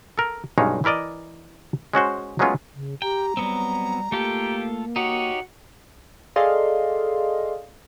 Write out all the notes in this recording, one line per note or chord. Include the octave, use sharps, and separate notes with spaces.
A4 A#4
B1 G2 G#3 C#4 D#4 F5
E3 E4 A#4 D5 D#5
G#3 C#4 F#4 C5
F#3 G#3 A3 B3 C#4 F4
C#3
G4 G5 A#5
F#3 G3 B3 C4
A3 A#3 F4 G4 A4
D#4 F#4 G4 C#5
G#4 A4 D5 D#5 F5 C6